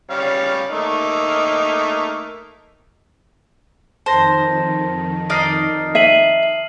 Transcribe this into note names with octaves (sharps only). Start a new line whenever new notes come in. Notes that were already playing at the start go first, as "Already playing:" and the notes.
G3 C#4 F5
A3 A#3 D#4
F2 D#3 C5 A5 A#6
D#4 D5 D#5 D#6 F6 C7
E5 C7 D#7 F#7